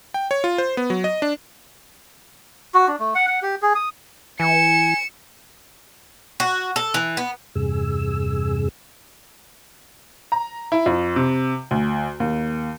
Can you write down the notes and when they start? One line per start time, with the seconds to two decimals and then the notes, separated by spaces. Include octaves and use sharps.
0.14 G5
0.31 C#5
0.44 F4
0.58 C5
0.77 B3
0.90 F#3
1.04 D#5
1.22 D4
2.74 F#4
2.88 D4
2.99 A3
3.15 F#5
3.27 F#5
3.43 G4
3.62 G#4
3.75 D#6
4.40 E3 G#5 C#7 E7
6.40 F#4
6.76 A4
6.94 E3
7.17 B3
7.55 E2 G2 C3 G#4 E6
10.32 A#5
10.72 E4
10.86 F2
11.16 C3
11.71 D2
12.20 D#2